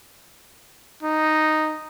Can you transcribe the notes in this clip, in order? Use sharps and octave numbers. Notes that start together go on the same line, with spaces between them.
D#4